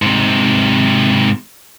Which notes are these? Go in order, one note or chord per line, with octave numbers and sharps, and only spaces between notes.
G#2 C3